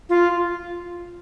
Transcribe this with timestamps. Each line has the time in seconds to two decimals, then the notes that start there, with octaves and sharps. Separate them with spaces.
0.09 F4